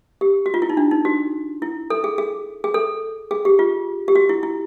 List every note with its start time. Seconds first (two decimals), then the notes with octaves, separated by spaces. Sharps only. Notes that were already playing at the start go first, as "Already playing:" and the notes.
0.21 G4
0.46 F#4
0.54 F4
0.62 E4
0.70 D#4
0.77 D4
0.91 D#4
1.05 F#4
1.62 E4
1.90 A4
2.04 G#4
2.18 G#4
2.64 G#4
2.74 A4
3.31 G#4
3.45 G4
3.59 F4
4.08 G4
4.15 F#4
4.29 E4
4.43 E4